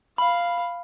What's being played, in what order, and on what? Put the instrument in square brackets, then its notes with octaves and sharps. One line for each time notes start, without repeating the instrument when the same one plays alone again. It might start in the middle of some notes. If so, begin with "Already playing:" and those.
[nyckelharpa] F5 [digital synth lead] B5